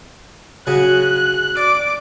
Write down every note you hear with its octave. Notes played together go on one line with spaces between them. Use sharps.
C#3 F#3 G#4 F#6
D5 D6